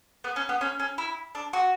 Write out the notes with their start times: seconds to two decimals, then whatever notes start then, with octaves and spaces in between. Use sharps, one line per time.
0.24 B3
0.36 C#4
0.49 B3
0.61 C#4
0.80 C#4
0.98 E4
1.35 D4
1.53 F#4